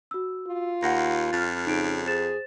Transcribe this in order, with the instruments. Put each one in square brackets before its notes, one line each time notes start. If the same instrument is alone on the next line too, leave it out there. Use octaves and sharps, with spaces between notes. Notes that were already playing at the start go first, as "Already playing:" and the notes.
[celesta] F#4 E6
[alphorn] F4
[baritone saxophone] D#2 [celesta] F#5 A#6
[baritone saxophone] F2 [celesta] F6 A6
[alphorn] C#3 [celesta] D#4 D7
[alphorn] G#4 [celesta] C5 A6 E7